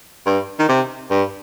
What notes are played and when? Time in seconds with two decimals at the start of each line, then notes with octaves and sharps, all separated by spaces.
0.26 G2
0.59 D#3
0.68 C3
1.10 G2